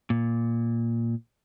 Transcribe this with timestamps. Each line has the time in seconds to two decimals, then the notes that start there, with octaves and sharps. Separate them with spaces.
0.10 A#2